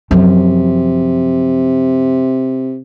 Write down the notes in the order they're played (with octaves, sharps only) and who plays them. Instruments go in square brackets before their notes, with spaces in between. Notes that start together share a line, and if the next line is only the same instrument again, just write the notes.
[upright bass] F#2 F3 [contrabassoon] C3